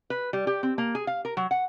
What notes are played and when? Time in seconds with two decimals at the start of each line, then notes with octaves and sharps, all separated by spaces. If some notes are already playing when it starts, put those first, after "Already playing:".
0.10 B4
0.33 G3
0.47 G4
0.63 C4
0.78 A#3
0.95 G#4
1.07 F5
1.25 A#4
1.37 F#3
1.51 F#5